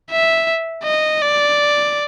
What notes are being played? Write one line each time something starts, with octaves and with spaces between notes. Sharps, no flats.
E5
D#5
D5